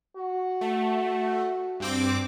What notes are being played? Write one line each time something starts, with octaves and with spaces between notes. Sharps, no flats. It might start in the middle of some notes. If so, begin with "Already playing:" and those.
F#4
A3
G2 C4 D6